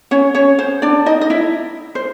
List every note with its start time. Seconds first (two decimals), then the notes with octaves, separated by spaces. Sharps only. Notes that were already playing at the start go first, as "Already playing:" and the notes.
0.11 C#4 C#5
0.35 C#4 C#5
0.59 C5
0.82 D4 D5
1.06 D#4 D#5
1.21 D#5
1.30 E4 E5
1.95 C5